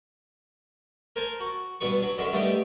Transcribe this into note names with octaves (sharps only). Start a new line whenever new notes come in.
A#4 C5 G#5 A5 C6
F#4
G2 B2 D4 B4 C#6
F#3
F#2 D3 D#3 F#4 C6
G3 A3 B3 D4 D#4 G4